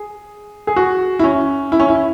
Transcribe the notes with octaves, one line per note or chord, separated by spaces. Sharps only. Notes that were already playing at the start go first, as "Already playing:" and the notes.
Already playing: G#4
G#4
F#4
E4
C#4
E4
C#4
E4